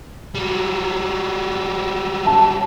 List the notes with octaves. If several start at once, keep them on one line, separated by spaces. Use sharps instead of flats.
F#3 G3
A5